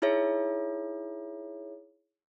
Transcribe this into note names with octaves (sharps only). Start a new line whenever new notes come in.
D#4 E4 G#4 C#5 E5